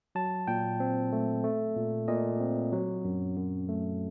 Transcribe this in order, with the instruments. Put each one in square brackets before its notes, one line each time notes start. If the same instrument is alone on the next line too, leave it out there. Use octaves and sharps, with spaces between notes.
[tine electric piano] F#3 A5
A#2 G5
C4
A3
A3
A#2
A#2 D#5
C4
F#3
F#2
F#2
A3